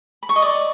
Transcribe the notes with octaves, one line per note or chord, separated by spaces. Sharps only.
B5
C#6
D#5
D5